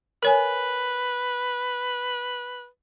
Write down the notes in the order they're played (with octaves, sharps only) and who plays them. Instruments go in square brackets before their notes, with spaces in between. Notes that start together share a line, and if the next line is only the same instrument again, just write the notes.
[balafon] A#4 C#5 G#5 [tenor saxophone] B4